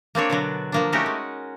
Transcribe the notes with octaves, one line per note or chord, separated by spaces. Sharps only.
A#3 C4 D4 C#5
B2 D3 F#3
F3 A#3 D4
A3 C#4 D#4 F#4 G4 A#4
G#3